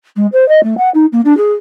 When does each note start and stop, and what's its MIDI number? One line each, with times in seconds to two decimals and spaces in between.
0.16 0.26 56
0.32 0.47 72
0.48 0.63 75
0.63 0.77 57
0.77 0.89 78
0.94 1.06 63
1.12 1.21 58
1.25 1.36 62
1.37 1.52 68